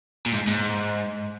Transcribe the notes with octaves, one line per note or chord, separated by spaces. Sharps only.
A#2
G#2
G#2